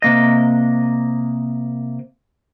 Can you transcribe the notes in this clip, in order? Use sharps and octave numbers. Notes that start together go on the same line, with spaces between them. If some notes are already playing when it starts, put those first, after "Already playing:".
C3 A#3 D#5